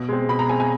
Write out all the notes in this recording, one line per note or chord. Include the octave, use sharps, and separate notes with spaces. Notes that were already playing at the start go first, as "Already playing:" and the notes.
Already playing: B2
G#3 C4
B2 B5
A#5
G#3 C4 G#5
G#5